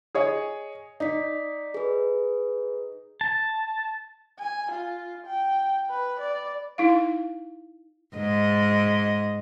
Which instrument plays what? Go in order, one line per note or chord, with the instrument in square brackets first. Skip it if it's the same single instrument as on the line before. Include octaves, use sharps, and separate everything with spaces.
[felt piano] G#4 C#5 D#5
[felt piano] D#4 [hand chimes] D5 B6
[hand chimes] G#4 B4
[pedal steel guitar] A5
[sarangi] G#5
F4
G5
B4
D5
[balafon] D#4 E4 F5
[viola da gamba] G#2 D#5